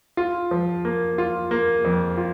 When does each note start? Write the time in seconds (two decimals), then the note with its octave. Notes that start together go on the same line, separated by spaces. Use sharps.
0.17 F4
0.51 F3
0.85 A#3
1.18 F4
1.51 A#3
1.85 F2
2.17 F4